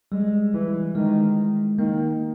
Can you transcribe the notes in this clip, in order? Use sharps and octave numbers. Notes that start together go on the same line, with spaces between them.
G3 G#3
E3
D#3 G#3
D#3 A#3